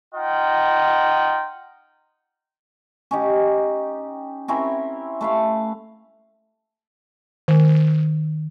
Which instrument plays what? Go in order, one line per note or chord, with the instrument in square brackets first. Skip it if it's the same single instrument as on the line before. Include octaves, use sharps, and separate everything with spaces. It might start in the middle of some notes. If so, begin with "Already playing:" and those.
[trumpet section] D#4 F4 D#5 F#5 G5
[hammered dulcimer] C#4 D#4 G4
C4 C#4 E4 A#4
A3 B4 F5
[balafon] D#3